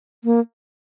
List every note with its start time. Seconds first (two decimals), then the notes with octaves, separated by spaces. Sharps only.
0.24 A#3